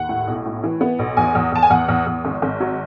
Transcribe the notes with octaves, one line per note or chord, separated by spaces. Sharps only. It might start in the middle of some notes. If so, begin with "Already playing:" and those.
Already playing: D#2 F#5
A2
B1
A2
E3
B3
B1
E2 G#5
E2
E2 A5
G#5
E2 F#5
E2
E2
G#1
G#1
F#3